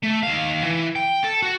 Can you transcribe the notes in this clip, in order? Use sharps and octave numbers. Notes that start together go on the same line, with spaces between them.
A3
D#2 F5
E3
G5
A4
F#4